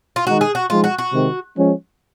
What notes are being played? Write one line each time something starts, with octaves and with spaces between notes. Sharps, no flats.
F4
D#3 G#3 D#4 F#4
G#4
F#4
F3 G#3 D#4 F4
F#4
F#4
C3 D#3 G#3 C4
F3 G#3 C#4